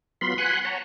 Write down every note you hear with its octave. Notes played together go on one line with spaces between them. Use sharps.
F#3 B3 F4 B5 C6
F#5 G#5 B5 C6 F#6
C#5 F#5 A5 A#5